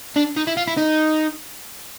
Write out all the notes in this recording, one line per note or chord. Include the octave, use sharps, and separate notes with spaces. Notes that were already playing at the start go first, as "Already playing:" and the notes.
D4
D#4
E4
F4
E4
D#4